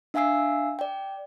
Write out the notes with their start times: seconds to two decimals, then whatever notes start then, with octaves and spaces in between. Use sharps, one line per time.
0.14 D4 E5 F5 G#5 E6 C7
0.79 D5 G5